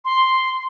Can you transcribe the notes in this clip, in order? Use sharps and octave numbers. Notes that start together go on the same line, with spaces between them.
C6